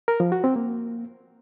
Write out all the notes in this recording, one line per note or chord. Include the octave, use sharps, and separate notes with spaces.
A#4
F3
F#4
C4
A#3